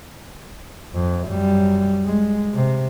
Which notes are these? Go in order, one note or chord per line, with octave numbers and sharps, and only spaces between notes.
F2
F#2 G3
G#3
C3